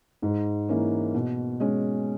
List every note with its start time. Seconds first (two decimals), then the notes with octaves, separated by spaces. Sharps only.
0.22 G#2
0.69 E3 A#3 C#4
1.14 B2
1.60 G#3 C#4